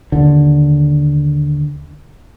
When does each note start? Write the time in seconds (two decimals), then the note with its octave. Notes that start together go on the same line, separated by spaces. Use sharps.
0.12 D#2 D3